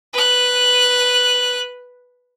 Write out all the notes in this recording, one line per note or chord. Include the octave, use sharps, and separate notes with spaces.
B4 F#6